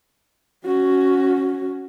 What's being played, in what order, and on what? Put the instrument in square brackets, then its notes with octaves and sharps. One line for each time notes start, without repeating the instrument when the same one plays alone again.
[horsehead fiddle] C#4 F#4